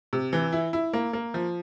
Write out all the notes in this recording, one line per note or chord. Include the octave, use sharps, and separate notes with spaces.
C3
E3
E4
E4
A#3
A#3
F3